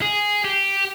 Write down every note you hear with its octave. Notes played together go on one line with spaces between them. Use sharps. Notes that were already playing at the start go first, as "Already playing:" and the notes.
G#4
G4